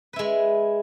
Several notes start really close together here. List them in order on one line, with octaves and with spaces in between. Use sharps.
B4 E4 G#3